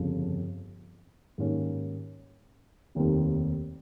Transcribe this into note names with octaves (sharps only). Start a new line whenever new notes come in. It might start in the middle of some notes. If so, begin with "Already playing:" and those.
Already playing: G1 F2 C#3 F3
G#2 D#3 G3 A#3 C#4
F1 D#2 D#3 G3 C4